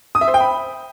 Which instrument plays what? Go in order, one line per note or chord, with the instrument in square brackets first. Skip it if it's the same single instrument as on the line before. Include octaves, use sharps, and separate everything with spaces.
[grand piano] D#6
E5
C5
G5
B5